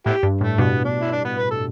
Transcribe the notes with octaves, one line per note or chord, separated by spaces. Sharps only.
A2 B3 E4 G4
G2
A2 A3
G2 B2 B3
D4
E4
D4
B3
B4
A4